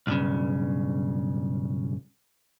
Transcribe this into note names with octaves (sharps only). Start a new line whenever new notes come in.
B1 G2 A#2 C#3